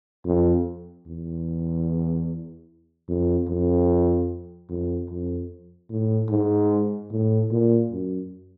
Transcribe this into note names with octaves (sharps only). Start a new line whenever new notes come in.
F2
E2
F2
F2
F2
F2
A2
G#2
A2
A#2
F#2